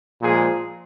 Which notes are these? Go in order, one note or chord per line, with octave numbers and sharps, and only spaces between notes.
A#2 F3 G#3 G#4